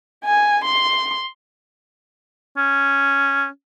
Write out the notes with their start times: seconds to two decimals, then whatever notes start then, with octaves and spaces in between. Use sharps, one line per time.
0.25 G#5
0.65 C6
2.57 C#4